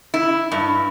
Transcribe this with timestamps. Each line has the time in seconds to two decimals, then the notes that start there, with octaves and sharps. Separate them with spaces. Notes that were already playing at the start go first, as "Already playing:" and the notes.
0.14 E4
0.52 G2